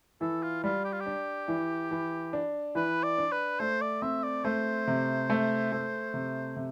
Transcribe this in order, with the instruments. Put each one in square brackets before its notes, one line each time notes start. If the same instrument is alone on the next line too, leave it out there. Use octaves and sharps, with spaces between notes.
[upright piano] E3 [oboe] A4
[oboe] F4
[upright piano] G3 [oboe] F4
[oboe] G4
F4
G4
[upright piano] D4
E3
E3
D4
[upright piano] E3 [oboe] B4
[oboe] D5
[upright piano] D4
[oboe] B4
[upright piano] A3 [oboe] C5
[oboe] D5
[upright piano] C4 [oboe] E5
[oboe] D5
[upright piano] A3 [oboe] C5
[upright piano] C3
A3
A3
C3
C3